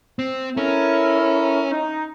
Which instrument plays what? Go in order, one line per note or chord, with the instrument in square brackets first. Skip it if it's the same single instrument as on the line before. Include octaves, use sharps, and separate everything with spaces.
[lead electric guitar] C4
[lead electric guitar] C#4 [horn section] E4 A4 A#4
[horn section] D#4